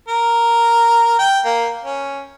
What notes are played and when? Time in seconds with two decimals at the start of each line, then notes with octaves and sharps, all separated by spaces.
0.08 A#4
1.19 G5
1.45 A#3
1.84 C#4